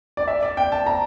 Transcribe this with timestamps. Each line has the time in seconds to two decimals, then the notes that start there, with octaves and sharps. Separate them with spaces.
0.17 D5
0.28 E5
0.43 D5
0.57 G5
0.72 A5
0.86 A#5